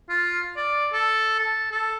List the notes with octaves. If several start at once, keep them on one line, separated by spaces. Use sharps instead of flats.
F4
D5
A4
A5
A4